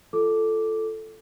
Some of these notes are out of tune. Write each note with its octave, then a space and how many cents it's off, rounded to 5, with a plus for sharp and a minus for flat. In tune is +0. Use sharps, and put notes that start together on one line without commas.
F4 -20 A4 +0 D6 +0